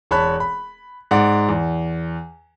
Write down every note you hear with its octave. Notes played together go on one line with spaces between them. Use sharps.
E1 C#5 A5 B5 F#6
B5
G#2 D5 F#5
E2